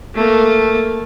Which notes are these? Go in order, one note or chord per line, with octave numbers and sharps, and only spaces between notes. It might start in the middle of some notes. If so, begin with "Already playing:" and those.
A3 A#3